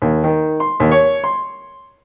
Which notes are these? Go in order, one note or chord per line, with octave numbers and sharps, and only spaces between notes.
D#2
D#3
C6
D#2
C#5
C6